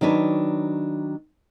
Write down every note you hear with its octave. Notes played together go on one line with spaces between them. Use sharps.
D#3 F#3 D4 B4 C#5